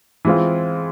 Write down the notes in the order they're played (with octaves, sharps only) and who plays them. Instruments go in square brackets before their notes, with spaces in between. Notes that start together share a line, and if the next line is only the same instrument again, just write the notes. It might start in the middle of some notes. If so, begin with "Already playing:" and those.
[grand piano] E3 G#3 C4 F4